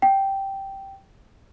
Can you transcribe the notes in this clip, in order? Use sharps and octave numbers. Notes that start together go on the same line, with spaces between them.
G5